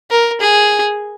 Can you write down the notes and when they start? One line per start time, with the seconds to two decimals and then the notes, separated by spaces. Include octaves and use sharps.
0.11 A#4
0.41 G#4